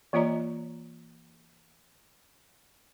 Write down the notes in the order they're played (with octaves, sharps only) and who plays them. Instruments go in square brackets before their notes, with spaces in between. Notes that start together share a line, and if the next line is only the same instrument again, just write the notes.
[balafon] E3 A#3 F4 C#5 D#5 A#5